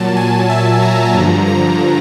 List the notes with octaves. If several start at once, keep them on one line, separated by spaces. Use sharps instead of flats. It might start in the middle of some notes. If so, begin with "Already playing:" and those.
Already playing: A#2 F#3 A5
G#5
E5
A#5
G2 D3 F3
A#5